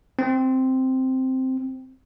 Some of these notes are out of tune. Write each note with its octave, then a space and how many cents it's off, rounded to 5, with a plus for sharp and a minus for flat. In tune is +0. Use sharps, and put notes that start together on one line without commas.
C4 -5